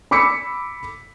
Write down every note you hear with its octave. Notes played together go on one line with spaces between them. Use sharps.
B5 D6 E6 B6 C#7